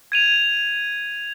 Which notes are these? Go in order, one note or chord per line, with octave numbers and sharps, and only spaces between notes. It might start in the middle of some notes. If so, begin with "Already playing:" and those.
G#6 D#7 F7